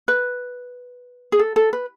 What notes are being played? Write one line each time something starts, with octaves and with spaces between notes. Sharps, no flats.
B4
G#4
A4
A4
B4